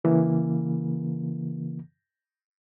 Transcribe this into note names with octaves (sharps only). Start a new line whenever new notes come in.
C#3 E3 A#3